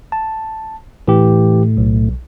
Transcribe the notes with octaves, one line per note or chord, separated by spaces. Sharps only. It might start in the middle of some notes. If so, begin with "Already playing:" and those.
A5
A2 E3 G4
B1